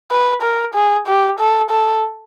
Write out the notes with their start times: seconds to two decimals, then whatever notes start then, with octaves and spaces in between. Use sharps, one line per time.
0.11 B4
0.42 A#4
0.74 G#4
1.07 G4
1.39 A4
1.70 A4